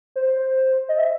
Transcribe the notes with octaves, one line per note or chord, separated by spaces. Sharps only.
C5
D#5
E5